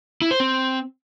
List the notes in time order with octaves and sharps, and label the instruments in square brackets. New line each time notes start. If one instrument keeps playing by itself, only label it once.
[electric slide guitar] E4
C5
C4